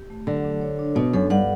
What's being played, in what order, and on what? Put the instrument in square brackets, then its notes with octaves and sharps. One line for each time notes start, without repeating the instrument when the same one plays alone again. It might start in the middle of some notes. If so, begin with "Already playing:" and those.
Already playing: [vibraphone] G4
A3
[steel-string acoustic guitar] D3 [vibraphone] F#3
[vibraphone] D4
C#5
D4
[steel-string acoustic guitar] B2 [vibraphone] B3
[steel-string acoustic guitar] F#2 [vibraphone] A4
[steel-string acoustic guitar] G2 [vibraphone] F#5